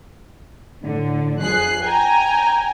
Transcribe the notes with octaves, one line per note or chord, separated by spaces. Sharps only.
A2 D3
F2 F3 G#4 F#6 C7
G5 G#5 A#5